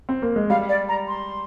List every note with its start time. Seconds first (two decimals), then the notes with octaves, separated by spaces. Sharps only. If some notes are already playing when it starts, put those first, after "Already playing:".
0.09 C4
0.22 A#3
0.36 G#3
0.50 G3 F5
0.69 D5
0.89 A#5
1.08 C6